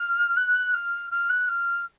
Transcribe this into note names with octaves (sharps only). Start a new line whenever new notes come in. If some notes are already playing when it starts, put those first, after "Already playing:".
Already playing: F6
F#6
F6
F6
F#6
F6